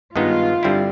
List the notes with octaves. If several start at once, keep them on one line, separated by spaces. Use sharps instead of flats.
G2 D#3 G#3 B3 D#4 F4
G2 D3 G3 C4 E4